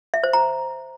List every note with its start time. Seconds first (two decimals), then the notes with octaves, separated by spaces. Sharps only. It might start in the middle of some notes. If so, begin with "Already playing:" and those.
0.14 E5
0.23 C5
0.33 A#5